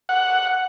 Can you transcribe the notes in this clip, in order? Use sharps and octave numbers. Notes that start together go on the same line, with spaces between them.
F#5